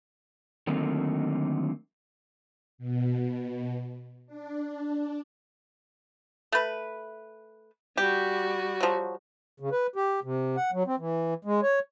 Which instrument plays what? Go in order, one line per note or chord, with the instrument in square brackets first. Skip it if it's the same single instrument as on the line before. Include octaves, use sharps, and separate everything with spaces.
[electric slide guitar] D3 D#3 F#3 A3 A#3 C4
[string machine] B2
D4
[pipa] A3 B4
[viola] G3 F#4 [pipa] G4
[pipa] F3 F#3
[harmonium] C#3
B4
G4
C3
F#5
F#3
C4
E3
G#3
C#5